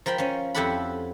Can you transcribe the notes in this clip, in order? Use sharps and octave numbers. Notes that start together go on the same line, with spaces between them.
F3 A#4 G5 B5
F3 C#4
F2 E4 G4 A4 F#5 B5